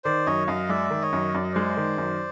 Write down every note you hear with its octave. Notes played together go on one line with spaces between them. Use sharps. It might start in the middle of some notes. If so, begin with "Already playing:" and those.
D#3 C5 D5
F#2 C#5 D#5
F#2 D#5 F5
G#3 D5 E5
D#3
C#5 D#5
F#2
F#2 D5
D#5
G#3 C5 D5
D#3
F#2